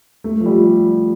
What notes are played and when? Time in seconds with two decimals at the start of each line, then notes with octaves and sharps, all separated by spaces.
0.24 A3
0.40 F3
0.46 G3